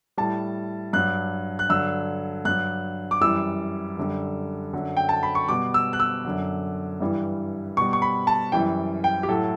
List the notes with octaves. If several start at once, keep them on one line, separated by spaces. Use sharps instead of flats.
A2 G3 A5
G2 F#3 F#6
F#6
G2 D3 F#3 E6
G2 F#3 F#6
D6
F#2 E3 G3 E6
F#2 D3 G3
F#2 D3 F#3
G5
A5
B5
C#6
B2 G3 D6
E6
F#6
E6
F#2 D3 F#3
G2 E3 G3
B2 G3 C#6
C#6
B5
A5
F#2 E3 G3 G5
G5
G4
A2 F#3 A4